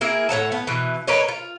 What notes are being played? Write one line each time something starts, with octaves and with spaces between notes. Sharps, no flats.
A#3 E4 G#4 A#4
A2 C#5 F#5 A5
B3
B2 E3
A#3 B4 C#5 D#5
F4